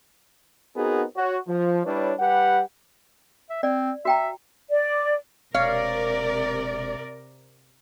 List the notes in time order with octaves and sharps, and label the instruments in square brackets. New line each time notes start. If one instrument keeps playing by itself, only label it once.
[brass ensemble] B3 C4 D#4 F#4 G#4 A#4
F#4 C#5
F3
G3 D4 E4 B4 C#5
G3 G4 B4 F#5
[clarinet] E5
[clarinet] C4 [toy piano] D5
[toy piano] F#4 G5 A#5 [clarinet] E5
[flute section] D5
[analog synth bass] E1 [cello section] C3 A#4 D5 [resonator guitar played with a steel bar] C#5 F5